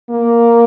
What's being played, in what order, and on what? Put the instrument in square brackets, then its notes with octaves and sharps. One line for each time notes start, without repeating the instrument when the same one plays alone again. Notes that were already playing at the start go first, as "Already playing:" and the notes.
[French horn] A#3